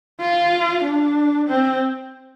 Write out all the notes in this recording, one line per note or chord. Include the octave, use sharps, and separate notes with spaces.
F4
D4
C4